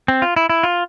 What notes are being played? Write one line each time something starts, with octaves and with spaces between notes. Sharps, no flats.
C4
F4
E4
E4
F4